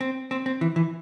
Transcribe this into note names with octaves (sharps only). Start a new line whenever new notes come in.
C4
C4
C4
E3
E3